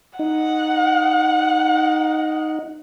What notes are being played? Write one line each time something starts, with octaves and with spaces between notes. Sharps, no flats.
D#4 F#5